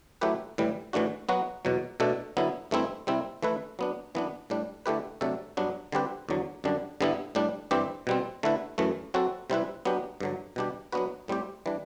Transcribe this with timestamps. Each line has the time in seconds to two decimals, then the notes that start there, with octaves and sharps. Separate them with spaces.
0.21 F#3 A3 E4 G4 B4
0.58 A2 E3 G3
0.93 A2 E3 A3 D4 F#4
1.29 F#3 B3 F#4
1.65 E2 B2 F#3
2.00 B2 A3 D4 A4
2.37 D3 F#3 B3 E4
2.71 G2 E3 A3 C4 E4
3.07 C3 G3 C4 E4
3.43 E3 A3 E4 B4
3.79 F#3 B3 D4
4.15 F#2 E3 B3 D4
4.50 A2 G3 D4
4.86 D3 A3 E4 G4 B4
5.21 C3 F#3 A3 D4 A4
5.57 G2 F#3 B3 D4
5.92 D3 G3 C4 G4 B4
6.29 E2 D3 F#3
6.64 F#2 D3 G3 D4
7.01 G2 D3 G3 B3 E4
7.35 A2 G3 D4
7.71 G2 E3 G3 C4 G4
8.07 B2 G3 C4
8.43 D3 A3 E4 B4
8.78 F#2 E3 A3
9.14 F#3 C4 F#4 A4
9.50 C3 G3 C4 E4 B4
9.85 F#3 B3 D4 G4
10.21 G2 D3 F#3
10.56 B2 G3 D4 G4
10.92 F#3 B3 D4 F#4 B4
11.28 A2 G3 C4 G4
11.66 E3 G3 D4